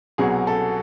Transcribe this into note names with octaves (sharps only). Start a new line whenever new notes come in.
C2 B2 F#3 G#4
A4